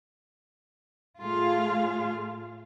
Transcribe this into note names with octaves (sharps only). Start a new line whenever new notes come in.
A2 A3 F4 G#4 F5